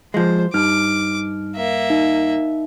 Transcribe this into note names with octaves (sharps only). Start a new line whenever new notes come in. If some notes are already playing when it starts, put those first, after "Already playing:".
F3 G#3 C5
G2 D#4 D6 F6
A#3 E5
D#4